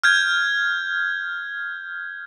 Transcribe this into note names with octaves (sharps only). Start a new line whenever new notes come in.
F6 G6 G#6